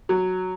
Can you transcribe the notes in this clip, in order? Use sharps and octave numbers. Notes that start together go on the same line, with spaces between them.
F#3